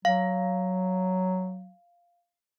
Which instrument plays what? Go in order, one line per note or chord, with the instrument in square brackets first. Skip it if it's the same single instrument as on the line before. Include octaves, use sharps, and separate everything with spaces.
[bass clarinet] F#3 [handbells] F5